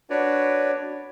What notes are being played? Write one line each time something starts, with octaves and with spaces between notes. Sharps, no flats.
D4 F#4 B4 C#5 D5